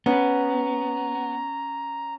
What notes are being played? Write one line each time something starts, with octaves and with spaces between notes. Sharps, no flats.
B3 C#4 A#5